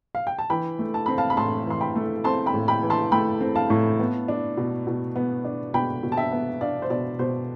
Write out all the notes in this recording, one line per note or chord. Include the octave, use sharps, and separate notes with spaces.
F5
G5
A5
E3 G5 B5
A3
A5
C4 B5
F5 A5
B5
A2 A5 C6
E3 C6
G5 B5
A3
C4 A5 C6
G5 B5
A2
G5 B5
E3
A5 C6
A3 G5 B5
C4
F5 A5
A2
B3
D4
B2
B2
B3
D4
B2 G5 B5
B2
A5
E5 G5
B3
D4 D5 F5
C5
B2 D5
B2 C5